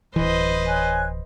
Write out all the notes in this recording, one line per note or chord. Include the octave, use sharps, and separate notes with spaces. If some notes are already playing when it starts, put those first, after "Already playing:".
D1 E3 B4 C5 D#5
C#5 G#5 F#6